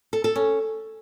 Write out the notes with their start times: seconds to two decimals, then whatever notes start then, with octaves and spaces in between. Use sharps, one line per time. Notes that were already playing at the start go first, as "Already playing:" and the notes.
0.13 A4
0.24 A4
0.36 C#4